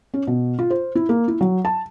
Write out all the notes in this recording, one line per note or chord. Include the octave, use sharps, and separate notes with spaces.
C#4
B2
F4
C5
E4
A#3
E4
F#3
A5